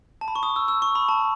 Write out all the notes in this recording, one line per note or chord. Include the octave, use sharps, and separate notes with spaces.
A5
B5
C#6
D#6
E6
E6
C#6
B5
A5